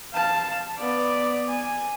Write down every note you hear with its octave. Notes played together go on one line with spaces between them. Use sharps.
F5 A5
B3 D5
G#5